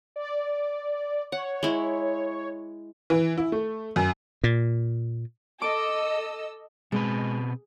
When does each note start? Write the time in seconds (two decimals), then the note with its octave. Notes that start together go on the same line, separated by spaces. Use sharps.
0.16 D5
1.32 C#5 F#5
1.63 G#3 E4
3.10 E3
3.38 E4
3.52 A3
3.96 F#2
4.44 A#2
5.62 A4 D#5 D6 E6
6.92 B2 G#3 C4 B4